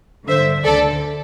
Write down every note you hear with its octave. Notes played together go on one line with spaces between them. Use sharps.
G2 D3 C5 E5
D2 D3 A4 D5